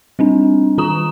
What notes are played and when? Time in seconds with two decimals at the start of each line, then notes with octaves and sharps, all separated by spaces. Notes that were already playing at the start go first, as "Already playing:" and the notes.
0.19 G3 C4 D4
0.78 D#3 F4 A#5 D#6 E7